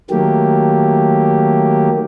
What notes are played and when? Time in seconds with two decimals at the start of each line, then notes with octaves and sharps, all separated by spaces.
0.10 D#3 F#3 A3 A#3 G4